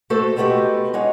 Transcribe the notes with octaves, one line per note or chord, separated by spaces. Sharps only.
A3 F#4 A4 C5
G#3 A3 B3 D4 F#4 G4
G#3 D#4 C#5 F#5